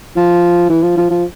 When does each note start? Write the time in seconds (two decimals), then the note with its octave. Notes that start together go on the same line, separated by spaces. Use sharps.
0.16 F3
0.70 E3
0.83 F3
0.97 F3
1.10 F3